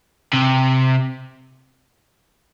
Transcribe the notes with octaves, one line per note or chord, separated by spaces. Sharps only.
C3